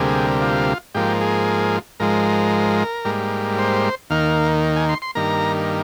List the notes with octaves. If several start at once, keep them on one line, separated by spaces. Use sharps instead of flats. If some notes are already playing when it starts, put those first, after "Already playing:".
Already playing: D2 C3 G3 A#3 G#4
F4
G#2 F3 A#3 G4
G#4
G#2 F3 G#3 A#4
G#2 G3 A#3
C5
D#2 D#3 A#3 F5
G#5
C6
C6
G2 D#3 A#3 A#5